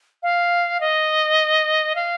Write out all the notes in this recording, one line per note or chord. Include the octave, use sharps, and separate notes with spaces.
F5
D#5
F5